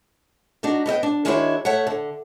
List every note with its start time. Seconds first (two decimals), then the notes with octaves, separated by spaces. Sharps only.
0.63 D4 D#4 F#4
0.86 B3 D#5 E5 G5
1.03 D4
1.25 D#3 G#3 D4 E4 F#4 C#5
1.65 A3 C#5 E5 F#5
1.87 D3